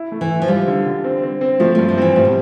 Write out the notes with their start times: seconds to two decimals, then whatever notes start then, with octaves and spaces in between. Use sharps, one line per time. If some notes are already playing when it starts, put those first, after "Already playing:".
Already playing: E4
0.12 A3
0.21 E3
0.31 E4
0.42 F3
0.48 G3 F4
0.67 D3
0.86 D3
1.04 C4
1.23 C4
1.41 C4
1.60 F3 A3
1.75 G2 A3
1.89 F3
1.98 E3 C4
2.16 A2 G3
2.25 B2